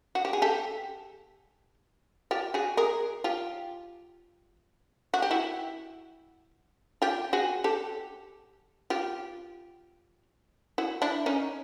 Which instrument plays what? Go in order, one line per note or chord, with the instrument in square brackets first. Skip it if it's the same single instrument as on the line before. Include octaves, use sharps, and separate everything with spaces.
[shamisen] F#4
G4
G#4
G4 A4
F4 G4
F#4 G#4
G#4 A#4
F4 G4
F#4
G4
E4 F#4
F4 G4
F#4 G#4
G4 A4
F4 G4
E4 F#4
D4 E4
C#4 D#4